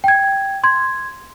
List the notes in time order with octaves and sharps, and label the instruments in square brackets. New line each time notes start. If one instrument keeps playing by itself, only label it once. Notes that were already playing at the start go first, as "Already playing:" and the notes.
[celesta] G5 G#6
C6 G#6